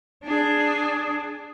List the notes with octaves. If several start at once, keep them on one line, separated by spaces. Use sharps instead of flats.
D4 G#4